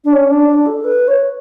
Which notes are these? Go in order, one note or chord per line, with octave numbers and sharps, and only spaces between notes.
D4
C#4
D4
D4
A4
B4
C#5